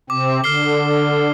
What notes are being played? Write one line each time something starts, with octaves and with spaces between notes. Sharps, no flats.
C3 C4 D6
D3 F6 C7 G7